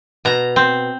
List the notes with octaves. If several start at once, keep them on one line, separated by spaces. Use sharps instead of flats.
B2 A#5
C4